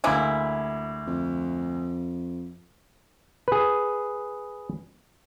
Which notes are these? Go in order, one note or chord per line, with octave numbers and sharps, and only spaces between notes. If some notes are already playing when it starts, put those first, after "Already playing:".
D2 G#3 A#3 E4 D6 G#6
F2
G#4 B4